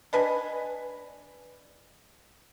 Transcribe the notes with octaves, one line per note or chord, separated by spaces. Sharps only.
D4 B4 D#5 G#5